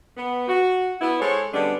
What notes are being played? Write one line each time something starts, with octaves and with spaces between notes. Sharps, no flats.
B3
F#4
B3 E4
G#3 A4 C5 C#5
D3 G3 G#3 B3 C#4 D4